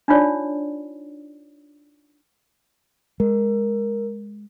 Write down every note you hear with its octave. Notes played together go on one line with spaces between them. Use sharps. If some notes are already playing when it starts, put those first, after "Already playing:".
D4 D#4 F4 C#5 D5
G#3 A#4